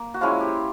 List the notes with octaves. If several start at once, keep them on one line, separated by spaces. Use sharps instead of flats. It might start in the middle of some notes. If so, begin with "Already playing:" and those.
Already playing: A#3
F#4
F3 G#3 C#4 E4 F4
G4